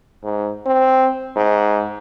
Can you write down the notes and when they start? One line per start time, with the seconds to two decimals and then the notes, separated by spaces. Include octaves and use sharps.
0.24 G#2
0.66 C4
1.36 G#2